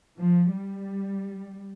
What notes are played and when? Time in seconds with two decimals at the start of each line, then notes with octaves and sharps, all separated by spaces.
0.19 F3
0.54 G3